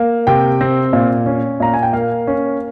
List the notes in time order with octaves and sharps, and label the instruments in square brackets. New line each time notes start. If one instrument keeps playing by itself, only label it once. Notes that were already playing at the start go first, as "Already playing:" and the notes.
Already playing: [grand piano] A#3
C3 G5
C4
A#2
C#4
A#2 A#5
G#5
G5
A#3 F5
C#4